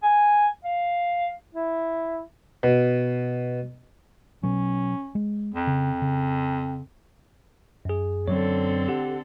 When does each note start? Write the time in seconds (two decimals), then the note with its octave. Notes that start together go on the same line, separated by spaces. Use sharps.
0.03 G#5
0.65 F5
1.55 E4
2.63 B2
4.43 B2 F#3 C#4
5.15 G#3
5.54 F2
5.67 C#3
6.02 C#3
7.85 F#2 G#4
8.28 F#2 D3 F#3 C4 A4 C#5
8.88 G4 F#5